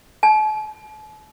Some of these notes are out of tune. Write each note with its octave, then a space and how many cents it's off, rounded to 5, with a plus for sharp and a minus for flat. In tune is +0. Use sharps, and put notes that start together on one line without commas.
A5 -40